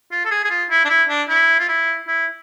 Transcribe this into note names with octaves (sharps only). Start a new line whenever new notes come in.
F4
A4
G#4
G#4
F4
E4
D4
E4
D4
E4
F4
E4
E4